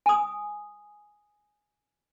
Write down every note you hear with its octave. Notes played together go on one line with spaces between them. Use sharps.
G#5 D#6